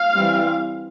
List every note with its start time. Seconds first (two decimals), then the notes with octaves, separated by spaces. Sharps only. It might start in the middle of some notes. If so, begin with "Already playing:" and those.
Already playing: F5
0.13 E3 G3 C4